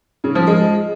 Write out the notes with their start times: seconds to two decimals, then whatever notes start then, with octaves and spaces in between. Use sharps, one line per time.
0.24 C#3
0.35 F3
0.47 G#3